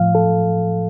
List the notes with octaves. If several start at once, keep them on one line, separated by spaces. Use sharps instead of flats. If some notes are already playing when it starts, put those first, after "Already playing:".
Already playing: A2 F3 F5
A4